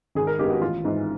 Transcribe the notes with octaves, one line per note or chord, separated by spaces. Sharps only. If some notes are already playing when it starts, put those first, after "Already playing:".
G#1 G#4
A#4
G2 D#3 G#3 B3 G4
F#4
A1 F4
G#2 E3 G#3